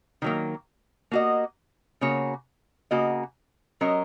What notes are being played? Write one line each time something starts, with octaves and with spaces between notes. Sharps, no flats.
D#3 F#3 A#3
A#3 F#4 D#5
C#3 A#3 F#4 C#5
C#3 A#3 F#4 D#5
F#3 C#4 A#4 D#5